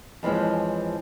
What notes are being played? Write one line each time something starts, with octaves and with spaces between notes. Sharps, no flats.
F2 E3 F3 G#3 C#4